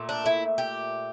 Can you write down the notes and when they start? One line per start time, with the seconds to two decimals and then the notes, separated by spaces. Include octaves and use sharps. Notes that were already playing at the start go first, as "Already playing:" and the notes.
Already playing: A#2 A3
0.09 D4
0.26 E4
0.58 G4